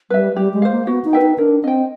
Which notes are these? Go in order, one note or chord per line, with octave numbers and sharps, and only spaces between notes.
G3 B4 E5
G3 G4
G#3
C5 F5
A#3
B3 F#4
D#4
B4 E5 G5
D#4
D4 A#4
C4 D#5 G5